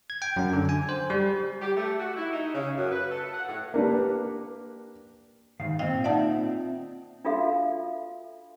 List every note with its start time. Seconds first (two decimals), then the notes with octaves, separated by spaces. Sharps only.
0.10 G#6
0.22 G5
0.36 F#2
0.53 D3
0.69 G#5
0.89 C5
1.10 G3
1.61 G4
1.76 A3
2.00 F#4
2.17 E4
2.32 D#4
2.54 C#3
2.77 F#2
2.91 B4
3.10 A4
3.33 F#5
3.48 A2
3.74 A#3 D4 G4 B4
5.60 G#2 D#3 F5
5.79 A#2 C4 D#5 F5 G5
6.04 A#3 D#4 F4 D5 E5 F#5 A5
6.31 C4
7.25 D4 F4 F#4 A4 E5 F5